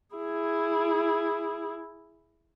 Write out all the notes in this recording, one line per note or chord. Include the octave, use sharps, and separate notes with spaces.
E4 G#4